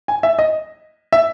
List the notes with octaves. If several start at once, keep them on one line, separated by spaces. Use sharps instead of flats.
G#5
E5
D#5
E5